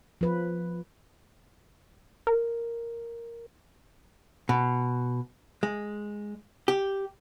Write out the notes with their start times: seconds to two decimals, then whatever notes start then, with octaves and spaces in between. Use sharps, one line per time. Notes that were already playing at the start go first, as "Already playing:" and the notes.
0.21 F3 B4
2.27 A#4
4.49 B2
5.63 G#3
6.68 G4